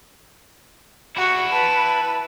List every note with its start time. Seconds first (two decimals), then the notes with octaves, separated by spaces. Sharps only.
1.16 E4 F#4 F#5
1.52 B4 A5